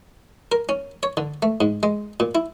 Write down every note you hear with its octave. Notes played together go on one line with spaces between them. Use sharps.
A#4
C#4
C#5
D3
A3
G#2
G#3
A#2
E4